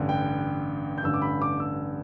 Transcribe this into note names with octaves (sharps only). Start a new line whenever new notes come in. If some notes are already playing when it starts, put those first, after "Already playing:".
Already playing: A1 G2 D3
G5
G6
A1 G2 D3 E6
D6
B5
D6
E6